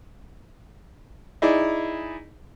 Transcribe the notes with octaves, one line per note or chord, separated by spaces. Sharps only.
D#4 E4 G#4 D5